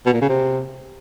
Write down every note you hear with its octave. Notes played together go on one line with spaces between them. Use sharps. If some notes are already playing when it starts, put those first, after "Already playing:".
B2
A#2
C#3
C3